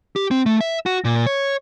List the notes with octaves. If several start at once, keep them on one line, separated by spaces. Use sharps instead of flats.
G4
C4
A3
E5
F#4
A#2
C#5